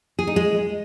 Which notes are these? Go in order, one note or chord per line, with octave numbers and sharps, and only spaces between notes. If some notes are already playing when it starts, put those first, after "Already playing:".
G#4
D#4
G#3